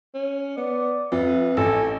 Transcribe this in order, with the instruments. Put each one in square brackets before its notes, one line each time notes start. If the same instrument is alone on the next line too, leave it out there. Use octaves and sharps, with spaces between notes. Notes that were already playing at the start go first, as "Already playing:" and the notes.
[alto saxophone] C#4
[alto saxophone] B3 [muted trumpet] D5
[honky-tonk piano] F2 [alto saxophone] B4 [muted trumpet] E5
[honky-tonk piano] A1 [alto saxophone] A4 [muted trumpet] G#5